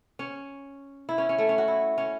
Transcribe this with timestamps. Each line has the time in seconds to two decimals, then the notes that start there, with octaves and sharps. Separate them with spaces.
0.19 C#4
1.09 E4
1.18 C#4
1.29 C#4
1.38 A3
1.49 C#4
1.58 F#4
1.68 E4
1.98 C#4